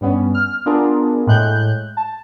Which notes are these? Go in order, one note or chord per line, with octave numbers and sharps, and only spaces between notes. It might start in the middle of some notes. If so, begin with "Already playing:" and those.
G2 G3 B3 C#4
F6
B3 D4 F4 G#4 A#4
A2 G#3 F#6 G6
A5